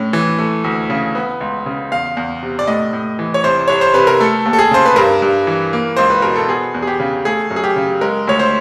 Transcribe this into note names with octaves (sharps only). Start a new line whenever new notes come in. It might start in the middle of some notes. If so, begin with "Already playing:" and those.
Already playing: A2 C#4
E3
A3
D2
C#3
B3
C#2
C#3
E2 F5
E2
C3
D5
A2 D#5
A2
E3
C#5
C2 C5
C2 C#5
C5
C3 B4
A#4
A3 A4
D#2
A4
G#4
C#3 C5
B4
G2 A#4
G2
E3
A#3
C#2 C5
B4
B2 A#4
A4
B3 G#4
E2
G#4
G4
C#3
A3 G#4
F#2
G#4
G4
C#3
G#3 A#4
D2 C#5
C5